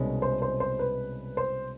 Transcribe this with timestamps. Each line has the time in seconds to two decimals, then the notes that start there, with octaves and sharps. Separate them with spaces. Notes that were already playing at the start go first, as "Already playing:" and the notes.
Already playing: C2 B2 G#3 C#4
0.22 C5
0.42 C5
0.60 C5
0.79 B4
1.37 C5